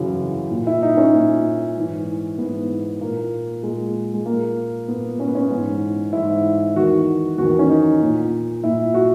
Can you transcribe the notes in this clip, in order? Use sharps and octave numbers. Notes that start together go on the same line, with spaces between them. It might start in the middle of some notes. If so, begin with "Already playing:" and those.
Already playing: F#2 C#3 E3
A#2
E4
D#4
C#4
A#2
G#2 E3
G#2 E3 B3
A#2 A#3
A#2 G#3
G#3
A#2 A#3
A#2 B3
C#4
B3
C#4
G#2 E3
G#2 E3 E4
E2 D#3 F#4
E2 D#3 F#4
C#4
D#4
A#2
A#2 E4
F#4